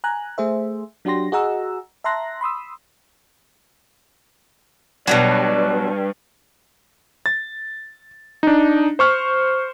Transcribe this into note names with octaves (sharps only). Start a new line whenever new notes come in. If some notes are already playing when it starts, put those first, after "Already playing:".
G#5 A#5 F#6
A3 G#4 C5 E5
F#3 D4 F#4 G4 C6 A#6
F#4 G#4 D#5 F#5 A#5 E6
E5 A5 A#5 C6 F#6 A#6
B5 C6 D#6 E6
G2 B2 D#3 F#3 D5
A6
D4 D#4
C5 C#6 F6